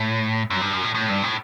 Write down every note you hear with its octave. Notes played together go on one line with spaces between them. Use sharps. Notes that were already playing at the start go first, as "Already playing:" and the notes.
Already playing: A2
F#2
G2
F#2
A2
A2
G2
A2